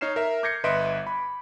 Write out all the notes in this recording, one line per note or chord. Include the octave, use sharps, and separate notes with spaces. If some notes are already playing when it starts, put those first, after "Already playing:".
D#4 C#5 F6 C7 E7
A#4 E5
D6 G6 G#6 A#6 C7 C#7
G1 B4 D#5 E5 C6 D7
B5